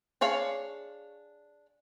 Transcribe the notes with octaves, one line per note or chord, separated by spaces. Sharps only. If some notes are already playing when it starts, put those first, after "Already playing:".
D4 G#4 C#5 F5